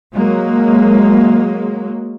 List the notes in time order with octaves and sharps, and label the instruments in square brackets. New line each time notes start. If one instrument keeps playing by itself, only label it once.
[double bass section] F#3 G#3 A#3